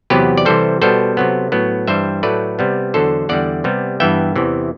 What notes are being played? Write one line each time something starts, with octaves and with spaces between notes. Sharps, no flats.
E2 C3 F#3 B3 G4 B4
D5
C3 E3 G3 A4 C5
B2 G3 B3 A4 C5
C3 F#3 B3
A2 F#3 B3
G2 E3 G3 C5 E5
A2 F#3 A3 B4 D5
C3 G3 B3
E2 D3 F#3 A4 C5
E2 D3 G3 D5 F#5
C3 G3 B3
G2 E3 B3 E5 G5
E2 C3 E3